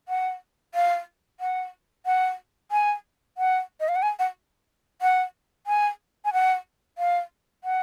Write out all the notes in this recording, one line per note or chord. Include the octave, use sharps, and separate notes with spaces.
F#5
F5
F#5
F#5
G#5
F#5
D#5
F5
F#5
G#5
F#5
F#5
G#5
G#5
F#5
F5
F#5